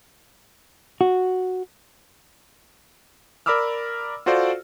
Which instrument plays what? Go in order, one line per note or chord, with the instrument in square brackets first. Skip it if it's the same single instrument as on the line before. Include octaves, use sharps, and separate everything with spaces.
[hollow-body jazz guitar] F#4
[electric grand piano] A#4 D5 B5 D6 E6 F6
F4 F#4 A4 C5 D5 F5